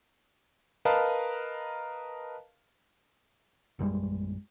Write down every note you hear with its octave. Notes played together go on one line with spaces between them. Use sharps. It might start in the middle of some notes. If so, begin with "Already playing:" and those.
A#4 B4 D#5 F5 A5 A#5
A#1 F#2 G3 G#3